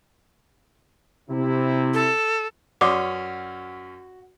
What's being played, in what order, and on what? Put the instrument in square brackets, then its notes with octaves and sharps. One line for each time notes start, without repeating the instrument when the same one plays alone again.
[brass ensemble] C3 E4
[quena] A4
[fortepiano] F#2 C#4 C6 [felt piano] F#4 [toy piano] B4 D5 D#6 [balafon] D6